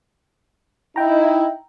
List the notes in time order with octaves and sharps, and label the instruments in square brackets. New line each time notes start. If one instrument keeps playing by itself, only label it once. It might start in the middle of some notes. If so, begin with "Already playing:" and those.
[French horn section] D#4 E4 [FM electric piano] G5 A#5